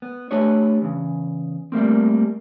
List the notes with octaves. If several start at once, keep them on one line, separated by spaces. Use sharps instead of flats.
B3
A3 D4 G4 B4 C#5
E2 C#3
G3 A3 A#3 C4